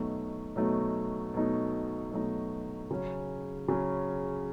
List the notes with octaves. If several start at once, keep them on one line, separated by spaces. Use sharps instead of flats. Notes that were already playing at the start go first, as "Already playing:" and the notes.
Already playing: B2 F#3 A3 D#4
B2 F#3 A3 D#4
B2 F#3 A3 D#4
B2 F#3 A3 D#4
C#3 F#3 C#4
C#3 F#3 C#4